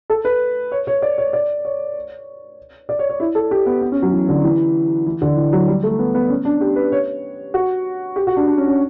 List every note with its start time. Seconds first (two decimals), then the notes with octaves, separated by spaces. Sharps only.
0.10 A4
0.25 B4
0.72 C#5
0.87 C#5
1.02 D5
1.18 C#5
1.33 D5
1.65 C#5
2.89 D5
2.99 C#5
3.10 C#5
3.20 E4
3.35 A4
3.51 G4
3.66 B3
3.82 B3
3.92 C#4
4.02 F#3
4.13 E3
4.29 D3
4.44 E3
5.06 E3
5.22 D3
5.36 E3
5.53 F#3
5.68 G3
5.83 A3
5.99 B3
6.15 B3
6.29 C#4
6.45 D4
6.61 G4
6.76 B4
6.92 C#5
7.54 F#4
8.16 G4
8.27 F#4
8.37 D4
8.47 D4
8.57 C#4
8.68 C#4